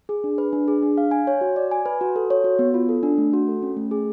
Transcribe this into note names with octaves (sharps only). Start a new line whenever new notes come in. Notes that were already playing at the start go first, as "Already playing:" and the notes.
G#4
D4
B4
D4
G#4
D4
F5
G#5
C#5
F#4
D5
G#5
B4
F#4
A4
C#5
F#4
B3
F4
A4
D4
A3
F#4
A4
C#4
A3
G#4